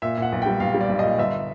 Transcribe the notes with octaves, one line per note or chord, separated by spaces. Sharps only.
A#2 E5
A#2 F#5
B1
G3 G5
B1 F5
G3
D5
B1
A#2 D#5
G1 E5